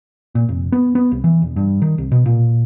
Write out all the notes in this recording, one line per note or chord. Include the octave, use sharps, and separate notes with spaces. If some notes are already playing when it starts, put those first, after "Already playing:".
A#2
F1
B3
B3
C2
E3
E1
G2
D#3
C2
B2
A#2